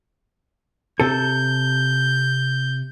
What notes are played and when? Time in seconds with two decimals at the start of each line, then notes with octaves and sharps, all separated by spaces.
1.00 C3 A4 G6